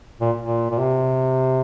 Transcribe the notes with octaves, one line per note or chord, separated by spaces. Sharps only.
A#2
A#2
A#2
C3